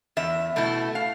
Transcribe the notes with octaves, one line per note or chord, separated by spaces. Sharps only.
E2 E5
B2 A3 E4
F5